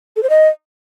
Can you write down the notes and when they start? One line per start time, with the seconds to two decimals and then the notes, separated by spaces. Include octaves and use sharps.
0.16 A4
0.23 C5
0.30 D#5